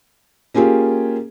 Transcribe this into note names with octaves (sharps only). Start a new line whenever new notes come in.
A#3 C#4 F4 G4 G#4